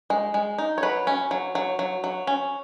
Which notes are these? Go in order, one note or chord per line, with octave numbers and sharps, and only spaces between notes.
G#3
G#3
D#4
C#5
F#3 B4
C#4
F#3
F#3
F#3
F#3
C#4